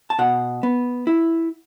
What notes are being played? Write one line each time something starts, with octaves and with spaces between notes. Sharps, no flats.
A5
B2 F#5
B3
E4